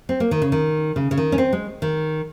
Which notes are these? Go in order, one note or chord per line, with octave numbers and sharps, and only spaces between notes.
C4
A#3
D#3
C#3
D#3
C#3
C#3
D#3
C#4
C4
G#3
D#3